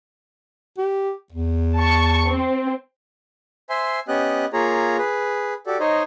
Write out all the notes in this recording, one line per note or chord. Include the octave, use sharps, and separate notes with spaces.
G4
E2
A5 C#6
C4
C5 E5 G#5 C6
B3 C#4 G4 D#5 F#6
A#3 F4 G#4 C#5 A#5
G#4 B4
F#4 G4 A4 D5
D#4 C5 C#5 D#5